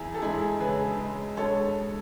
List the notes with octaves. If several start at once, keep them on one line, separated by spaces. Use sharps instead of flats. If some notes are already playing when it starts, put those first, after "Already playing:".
Already playing: E2 E4 G#4
A4
G#3 E4 G#4
C#3 G#4 B4
G#3
G#3 A4 C#5